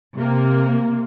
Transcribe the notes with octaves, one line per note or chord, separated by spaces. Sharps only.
C3 A#3